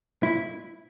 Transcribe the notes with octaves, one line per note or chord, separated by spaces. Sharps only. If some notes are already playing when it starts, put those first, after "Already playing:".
E4